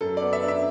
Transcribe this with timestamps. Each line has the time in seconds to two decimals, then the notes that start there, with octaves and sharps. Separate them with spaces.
0.01 F#2 A4
0.17 B3 D5
0.33 E5
0.43 D4
0.48 E5